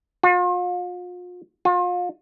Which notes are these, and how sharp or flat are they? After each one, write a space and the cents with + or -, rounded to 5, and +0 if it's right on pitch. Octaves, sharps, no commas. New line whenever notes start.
F4 +40
F4 +35